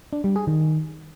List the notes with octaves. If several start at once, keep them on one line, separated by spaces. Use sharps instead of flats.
D4
G3
G#4
D#3